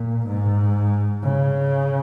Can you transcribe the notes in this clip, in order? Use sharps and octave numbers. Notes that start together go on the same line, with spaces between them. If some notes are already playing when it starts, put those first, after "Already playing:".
Already playing: A#2
G#2
C#3